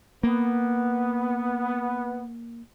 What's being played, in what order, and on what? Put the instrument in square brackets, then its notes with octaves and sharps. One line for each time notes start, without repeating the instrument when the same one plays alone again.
[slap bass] A#3 [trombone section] B3